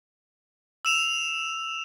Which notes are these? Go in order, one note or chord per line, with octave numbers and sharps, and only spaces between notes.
E6 E7 F7